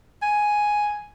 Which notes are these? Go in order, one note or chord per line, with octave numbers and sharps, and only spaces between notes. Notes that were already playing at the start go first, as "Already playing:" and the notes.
G#5